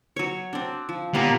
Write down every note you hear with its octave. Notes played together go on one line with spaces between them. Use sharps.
F#3 C#5
C4 D4
F3
A#2 G3 A#3 B3 A5